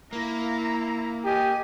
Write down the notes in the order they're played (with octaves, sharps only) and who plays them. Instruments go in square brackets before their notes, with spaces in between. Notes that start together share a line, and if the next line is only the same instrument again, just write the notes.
[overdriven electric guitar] A#3 [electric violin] E4 A#5
[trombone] G4 [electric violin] D#5 G#5